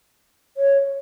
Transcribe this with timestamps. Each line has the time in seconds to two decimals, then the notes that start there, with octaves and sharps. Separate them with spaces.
0.57 C#5